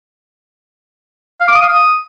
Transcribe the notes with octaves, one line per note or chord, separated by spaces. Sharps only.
F5
D6
D#6
F5
D#6